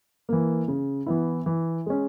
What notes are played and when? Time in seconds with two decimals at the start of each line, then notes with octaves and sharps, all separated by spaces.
0.29 E3 A#3
0.68 C#3
1.06 E3 B3 E4
1.46 E3
1.86 G#3 C#4